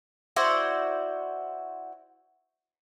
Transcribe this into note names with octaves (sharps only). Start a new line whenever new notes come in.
E4 F#4 C5 D5